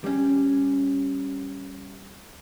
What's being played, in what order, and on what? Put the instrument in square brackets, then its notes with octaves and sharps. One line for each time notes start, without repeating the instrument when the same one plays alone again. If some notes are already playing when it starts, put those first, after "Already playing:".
[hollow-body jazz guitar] G3 C#4